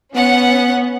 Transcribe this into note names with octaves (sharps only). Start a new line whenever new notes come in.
B3 C#4 F#5